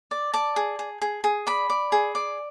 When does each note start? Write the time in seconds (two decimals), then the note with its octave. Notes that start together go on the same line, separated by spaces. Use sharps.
0.11 D5
0.33 D5 A5
0.56 G#4
0.79 G#4
1.02 G#4
1.24 G#4
1.47 D5 B5
1.70 D5
1.92 G#4
2.15 D5